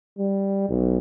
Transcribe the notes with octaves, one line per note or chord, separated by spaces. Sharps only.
G3
B1